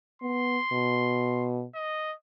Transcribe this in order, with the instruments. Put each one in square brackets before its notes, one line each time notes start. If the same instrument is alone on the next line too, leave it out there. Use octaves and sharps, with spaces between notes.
[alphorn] B3 [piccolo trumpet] C6
[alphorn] B2
[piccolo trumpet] D#5